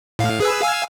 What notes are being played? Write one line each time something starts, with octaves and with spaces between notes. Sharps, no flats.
A2 F5
G#4 B4 E6
F5 G#5 E6